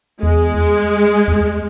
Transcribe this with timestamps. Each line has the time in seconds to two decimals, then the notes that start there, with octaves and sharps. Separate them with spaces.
0.22 E2 G#3
1.28 E2